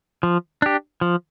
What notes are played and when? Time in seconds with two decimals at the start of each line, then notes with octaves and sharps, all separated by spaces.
0.23 F3
0.62 D4 G4
1.01 F3